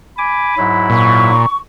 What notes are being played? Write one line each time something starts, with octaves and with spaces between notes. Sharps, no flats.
G#5 B5 D6
G#2 F#3 E4
A#2 C#6